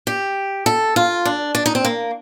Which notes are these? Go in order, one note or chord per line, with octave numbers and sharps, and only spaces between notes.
G4
A4
F4
D4
D4
D#4
C4
A#3